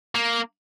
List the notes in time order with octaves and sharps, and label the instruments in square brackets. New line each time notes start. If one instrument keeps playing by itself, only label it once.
[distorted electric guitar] A#3